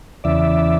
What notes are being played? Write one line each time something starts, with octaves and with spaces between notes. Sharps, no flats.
E2 C#3 E3 D5 E5